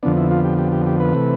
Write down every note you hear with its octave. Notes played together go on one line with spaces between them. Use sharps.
F2 D3 F3 B3 D4
E4
F4
G4
G4
G4
G4
B4
C3 E3 A3